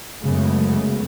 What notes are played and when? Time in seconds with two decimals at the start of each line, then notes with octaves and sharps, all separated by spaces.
0.24 F#2 C#3 G#3 A3 B3